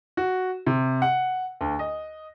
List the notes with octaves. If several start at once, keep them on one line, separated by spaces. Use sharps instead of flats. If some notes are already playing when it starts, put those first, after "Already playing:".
F#4
C3
F#5
D2
D#5